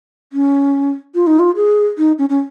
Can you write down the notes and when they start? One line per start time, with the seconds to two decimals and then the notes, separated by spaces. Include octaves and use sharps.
0.33 C#4
1.15 F4
1.27 D#4
1.39 F4
1.56 G#4
1.98 D#4
2.19 C#4
2.29 C#4